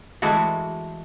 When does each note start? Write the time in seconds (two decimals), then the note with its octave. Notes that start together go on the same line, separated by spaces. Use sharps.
0.22 E3 G#3 A3 F#4